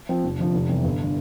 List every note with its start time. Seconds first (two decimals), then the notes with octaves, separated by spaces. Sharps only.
0.09 F3 C4
0.24 F1
0.39 F2 D3 F3
0.54 F1
0.69 E2 C3 G3
0.84 G1
1.04 D3